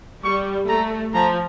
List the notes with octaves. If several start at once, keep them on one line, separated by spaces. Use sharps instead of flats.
G3 C#6
A3 A#5
F3 A#5